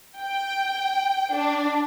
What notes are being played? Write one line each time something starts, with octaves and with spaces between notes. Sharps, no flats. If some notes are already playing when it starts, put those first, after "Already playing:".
G5
D4